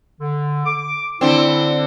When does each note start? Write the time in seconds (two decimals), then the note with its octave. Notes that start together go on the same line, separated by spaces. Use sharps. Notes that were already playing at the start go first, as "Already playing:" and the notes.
0.21 D3
0.66 D6
1.21 D3 C4 E4